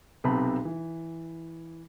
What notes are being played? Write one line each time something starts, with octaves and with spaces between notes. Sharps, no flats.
B1 C3 B3 C4 A5 B5
E3